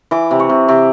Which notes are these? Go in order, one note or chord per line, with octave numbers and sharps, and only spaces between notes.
E3 D6
C3
C#6
C3
C3 D6